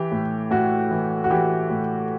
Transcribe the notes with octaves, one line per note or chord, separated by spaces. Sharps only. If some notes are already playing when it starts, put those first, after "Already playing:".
Already playing: E3 G4
A2
A2 F#4
E3
F#4
E3 G4
A2